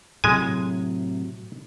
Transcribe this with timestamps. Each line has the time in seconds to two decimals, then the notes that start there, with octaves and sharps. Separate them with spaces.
0.24 A2 C3 F#3 G#3 G#5